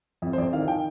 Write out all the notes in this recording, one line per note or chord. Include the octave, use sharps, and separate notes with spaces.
F2
C5
F2 D5
D#3 F5
D#3 G5